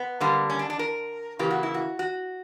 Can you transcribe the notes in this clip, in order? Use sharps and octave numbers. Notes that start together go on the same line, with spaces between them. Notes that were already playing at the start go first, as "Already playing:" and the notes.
Already playing: B3
D3 G3 A#3
C#4
D4
D4
A#4
C#3 E3 A#3 G4
F#4
E4
F#4
F#4